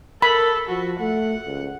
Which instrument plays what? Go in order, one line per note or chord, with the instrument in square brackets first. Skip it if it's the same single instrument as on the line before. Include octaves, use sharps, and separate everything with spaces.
[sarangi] A4 [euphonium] A#4 [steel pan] B5
[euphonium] F3 [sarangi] F#4
[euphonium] A3 [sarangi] F#5
[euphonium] C#2